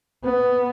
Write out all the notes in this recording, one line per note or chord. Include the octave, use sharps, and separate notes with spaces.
B3